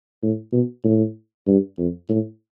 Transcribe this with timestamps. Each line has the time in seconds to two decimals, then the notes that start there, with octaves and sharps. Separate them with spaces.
0.23 A2
0.53 B2
0.84 A2
1.47 G2
1.78 F2
2.09 A2